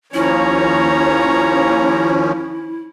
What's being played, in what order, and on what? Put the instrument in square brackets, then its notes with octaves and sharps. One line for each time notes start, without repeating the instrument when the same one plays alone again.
[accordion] D#2 F3 C#4 [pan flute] E4 [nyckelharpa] C#5 A#5